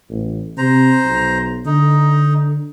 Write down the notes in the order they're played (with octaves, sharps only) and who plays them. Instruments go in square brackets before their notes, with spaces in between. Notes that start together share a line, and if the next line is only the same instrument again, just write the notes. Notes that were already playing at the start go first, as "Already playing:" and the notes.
[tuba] A1
[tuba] C3 [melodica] C5 A#5
[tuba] B1
[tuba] D3 [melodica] D#4